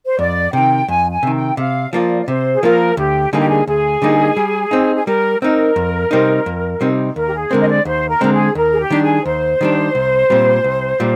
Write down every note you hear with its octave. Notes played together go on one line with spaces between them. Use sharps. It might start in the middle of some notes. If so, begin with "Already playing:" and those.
C5
F2 D5
C3 D#3 G5
F2 G#5
G#5
C3 D#3
G5
C3 F5
F3 A#3 F4 D5
D5
C3 C5
G#4
F3 A#3 F4 A#4
D2 G4
D3 G3 A#3 D#4 G#4
G4
G#4
D2 G#4
D3 G3 A#3 D#4
G3
C4 D#4
G#4
G3 A#4
C4 D#4 A#4
F2
C3 G3 C4 D#4
F2
C3 G3 C4 D#4
D#2 A#4
G4
G#4
D3 G#3 C4 A#4
D#5
D5
D#2 C5
A#4
D3 G#3 C4 A#4
G#4
D#2 A#4
G#4
G4
D#3 G3 D4
G#4
D#2 C5
D#3 G3 D4
C2
A#2 G3 C4
C2
A#2 G3